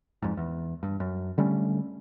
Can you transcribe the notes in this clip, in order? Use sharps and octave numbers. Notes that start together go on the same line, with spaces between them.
F2 G#2
E2
G2
F#2
D3 G3 A3 C#4